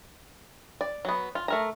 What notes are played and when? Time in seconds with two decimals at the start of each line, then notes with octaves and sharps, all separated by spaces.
0.81 D5
1.05 F#3 B3
1.35 F4
1.48 A3 A#4 A#5